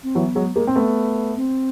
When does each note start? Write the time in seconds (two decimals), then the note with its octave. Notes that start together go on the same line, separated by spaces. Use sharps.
0.03 C4
0.15 E3 F#3 B3
0.35 F#3 G#3
0.56 G#3 A#3
0.67 C4
0.76 A3 B3
1.37 C4